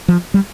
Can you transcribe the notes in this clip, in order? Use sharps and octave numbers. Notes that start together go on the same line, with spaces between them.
F3
G3